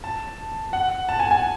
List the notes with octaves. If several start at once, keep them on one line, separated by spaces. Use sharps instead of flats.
A5
F#5
A5
G#5
G#5